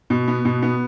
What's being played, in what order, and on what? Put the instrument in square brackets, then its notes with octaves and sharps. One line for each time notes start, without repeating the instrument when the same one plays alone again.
[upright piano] B2
B3
B2
B3